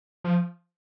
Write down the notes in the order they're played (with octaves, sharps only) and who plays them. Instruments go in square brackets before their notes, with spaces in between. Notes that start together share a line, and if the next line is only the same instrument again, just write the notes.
[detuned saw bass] F3